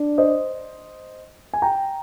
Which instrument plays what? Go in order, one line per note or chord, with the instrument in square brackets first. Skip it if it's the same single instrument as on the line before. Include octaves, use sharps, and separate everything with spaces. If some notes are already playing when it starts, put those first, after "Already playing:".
Already playing: [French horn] D4
[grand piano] C5 D#5
G#5
G5 A#5